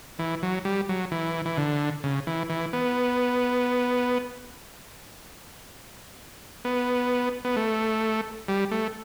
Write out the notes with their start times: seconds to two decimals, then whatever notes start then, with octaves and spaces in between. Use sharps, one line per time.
0.19 E3
0.43 F#3
0.65 G3
0.89 F#3
1.12 E3
1.45 E3
1.58 D3
2.04 C#3
2.27 E3
2.50 E3
2.73 B3
6.65 B3
7.45 B3
7.56 A3
8.48 G3
8.71 A3